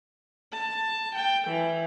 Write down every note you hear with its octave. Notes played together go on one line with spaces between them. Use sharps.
A5
G5
E3